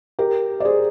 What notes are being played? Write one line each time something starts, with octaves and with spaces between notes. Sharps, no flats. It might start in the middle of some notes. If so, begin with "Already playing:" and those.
G4 A#4
D5
G#4 C5